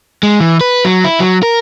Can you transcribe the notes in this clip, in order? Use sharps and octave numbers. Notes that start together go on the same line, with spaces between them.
G#3
E3
B4
F#3
E4
F#3
A#4